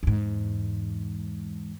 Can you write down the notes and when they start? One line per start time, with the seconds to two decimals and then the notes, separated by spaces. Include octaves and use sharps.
0.03 E2 G#2